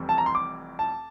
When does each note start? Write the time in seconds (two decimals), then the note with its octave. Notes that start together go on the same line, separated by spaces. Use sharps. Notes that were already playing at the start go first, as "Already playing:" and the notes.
Already playing: F1 F2 E3 G3
0.09 A5
0.18 A#5
0.26 C6
0.35 D6
0.79 A5